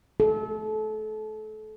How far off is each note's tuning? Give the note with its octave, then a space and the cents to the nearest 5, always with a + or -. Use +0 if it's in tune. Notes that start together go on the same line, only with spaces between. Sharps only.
A4 -30